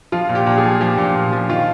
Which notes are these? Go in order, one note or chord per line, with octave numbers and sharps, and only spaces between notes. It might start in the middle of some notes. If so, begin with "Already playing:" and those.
F3 F4
A#2
G4
A#2
G#4
F3
F3 G4
A#2
A#2
F3
D#3 F4